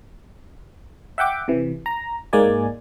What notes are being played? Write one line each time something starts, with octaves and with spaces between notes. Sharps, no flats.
E5 F#5 G5 D6
C3 E3
A#5
G#2 G#3 A#3 D5 G#5